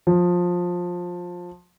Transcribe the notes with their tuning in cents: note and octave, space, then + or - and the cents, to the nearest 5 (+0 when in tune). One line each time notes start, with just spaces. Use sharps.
F3 +20